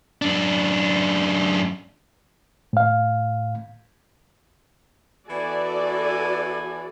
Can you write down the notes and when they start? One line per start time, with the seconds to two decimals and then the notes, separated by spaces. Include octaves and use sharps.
0.22 F#2 D4
2.73 A2 F5
5.29 E3 B3 F#4 A4 D5 G#5